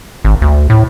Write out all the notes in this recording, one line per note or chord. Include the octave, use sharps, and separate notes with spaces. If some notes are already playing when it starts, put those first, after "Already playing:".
G#1
D2
A2